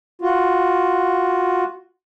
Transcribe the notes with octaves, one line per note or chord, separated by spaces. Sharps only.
F4 F#4